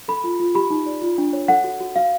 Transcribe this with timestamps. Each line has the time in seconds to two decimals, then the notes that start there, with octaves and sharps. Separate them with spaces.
0.08 A4 B5
0.24 F4
0.40 F4
0.55 G4 B5
0.70 D#4
0.86 D5
1.02 F4
1.18 D4
1.33 C#5
1.48 A4 F#5
1.64 F#4
1.81 F#4
1.95 F#4 F5